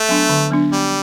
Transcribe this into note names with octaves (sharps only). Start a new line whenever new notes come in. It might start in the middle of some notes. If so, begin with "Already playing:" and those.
Already playing: A3
F#3 B3 D4
D3
F#3 B3 D4
G3 B3